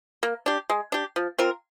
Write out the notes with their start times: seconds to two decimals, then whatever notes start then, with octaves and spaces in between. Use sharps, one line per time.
0.23 A#3
0.46 D4 G4
0.70 G#3
0.92 D4 G4
1.16 F3
1.38 C4 F4 A#4